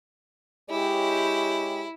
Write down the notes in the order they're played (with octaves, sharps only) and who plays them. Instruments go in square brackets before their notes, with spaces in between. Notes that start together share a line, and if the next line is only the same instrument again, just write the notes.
[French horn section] G#3 G4 C#5 [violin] E4